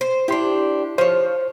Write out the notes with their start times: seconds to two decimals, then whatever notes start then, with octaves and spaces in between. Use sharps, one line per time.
0.01 C5
0.28 D4 E4 G4 C6
0.98 F3 C5 C#5